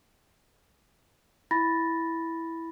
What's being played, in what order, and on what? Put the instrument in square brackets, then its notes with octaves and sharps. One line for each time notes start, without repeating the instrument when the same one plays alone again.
[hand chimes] E4 B5 A6 A#6